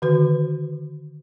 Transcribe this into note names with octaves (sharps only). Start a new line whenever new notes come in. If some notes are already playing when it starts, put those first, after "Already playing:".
D3 D#3 F#4 B4